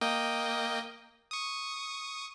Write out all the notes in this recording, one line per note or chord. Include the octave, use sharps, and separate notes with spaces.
A#3 D#5 G5
C#6 D#6